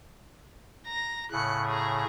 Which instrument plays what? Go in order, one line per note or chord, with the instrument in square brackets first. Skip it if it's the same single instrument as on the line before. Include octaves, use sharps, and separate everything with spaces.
[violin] A#5 A#6
[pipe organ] A2 C#3 [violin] F#6 C#7
[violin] G#4 A#5